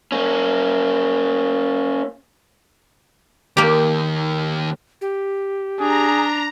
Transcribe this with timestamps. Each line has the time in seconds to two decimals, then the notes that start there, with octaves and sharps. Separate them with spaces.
0.12 A#3 C#4
3.57 D#2 A#3 G4
5.01 G4
5.80 D4 G#4 A#5